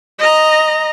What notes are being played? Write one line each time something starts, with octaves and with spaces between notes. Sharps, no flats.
D#5 A#5